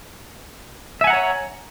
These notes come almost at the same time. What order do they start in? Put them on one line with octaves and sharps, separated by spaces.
E5 G#5 F#5 A#5 C#5